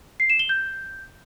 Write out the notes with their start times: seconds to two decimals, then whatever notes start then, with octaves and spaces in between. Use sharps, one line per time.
0.20 C7
0.30 E7
0.39 G7
0.49 G6